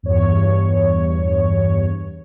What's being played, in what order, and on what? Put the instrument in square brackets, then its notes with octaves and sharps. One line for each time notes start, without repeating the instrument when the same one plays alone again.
[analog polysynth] E2 G2 C#5